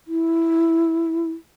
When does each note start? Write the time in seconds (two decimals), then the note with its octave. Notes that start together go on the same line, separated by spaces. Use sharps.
0.08 E4